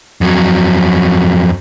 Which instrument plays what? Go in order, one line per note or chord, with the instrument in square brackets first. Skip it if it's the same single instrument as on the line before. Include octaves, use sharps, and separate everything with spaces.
[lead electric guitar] F2 F#3